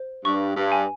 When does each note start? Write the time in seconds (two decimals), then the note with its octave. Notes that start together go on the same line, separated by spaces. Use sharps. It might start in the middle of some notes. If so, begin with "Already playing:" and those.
Already playing: C5
0.25 G2 C#6
0.57 G2
0.72 G#5